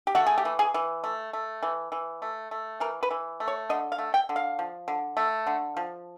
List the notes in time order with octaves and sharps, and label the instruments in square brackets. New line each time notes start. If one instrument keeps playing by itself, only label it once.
[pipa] G4
A3 F#4
G#4
G4
E3
G#4
E3
A3
A3
E3
E3
A3
A3
E3 A#4
B4
E3
A3
C#5
D3 D#5
F5
A3
G5
D3
F5
F3
D3
A3
D3
F3